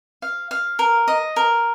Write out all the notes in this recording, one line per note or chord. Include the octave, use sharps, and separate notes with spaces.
F5
F5
A#4
D#5
A#4